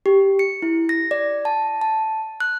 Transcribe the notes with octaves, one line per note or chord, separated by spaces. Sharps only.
G4
C#7
E4
A#6
D5
A5
A5
F#6